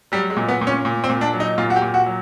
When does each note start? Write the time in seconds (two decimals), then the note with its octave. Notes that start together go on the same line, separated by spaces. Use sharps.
0.12 F#3 G3
0.30 G#3
0.37 A#2
0.48 B3
0.61 A#2
0.67 C#4
0.85 A#2
1.04 C4
1.10 A#2
1.21 D4
1.34 F#3
1.40 D#4
1.58 A#2 F4
1.70 F#4
1.76 G4
1.82 A#2
1.94 F#4
2.06 F#3